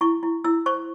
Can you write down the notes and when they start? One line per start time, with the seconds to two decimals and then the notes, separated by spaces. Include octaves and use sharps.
0.01 E4 C#6
0.23 E4
0.44 E4 E6
0.66 C5 C#6